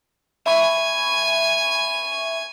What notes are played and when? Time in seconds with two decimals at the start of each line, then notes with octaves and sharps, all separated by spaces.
0.46 E5 G#5 B5 C#6